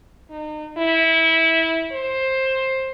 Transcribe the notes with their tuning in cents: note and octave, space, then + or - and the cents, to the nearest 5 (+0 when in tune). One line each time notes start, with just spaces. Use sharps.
D#4 -35
E4 -15
C5 +15